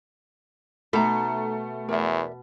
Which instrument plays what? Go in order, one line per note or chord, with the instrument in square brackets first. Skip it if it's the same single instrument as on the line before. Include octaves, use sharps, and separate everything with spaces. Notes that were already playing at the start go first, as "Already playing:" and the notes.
[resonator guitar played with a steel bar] B2 [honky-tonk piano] A3 [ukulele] D#4 A#5
[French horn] E2 [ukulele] A#4 D5 E5